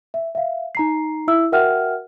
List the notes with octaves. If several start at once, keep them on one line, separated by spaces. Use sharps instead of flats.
E5
E5 F5
D#4 A#5 C7
E4 E5 E6
F#4 A#4 E5 F#5 G5 F6